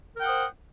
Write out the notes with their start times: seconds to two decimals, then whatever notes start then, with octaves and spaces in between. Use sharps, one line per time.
0.17 A#4
0.20 G5
0.23 F#5
0.26 D#6
0.29 C5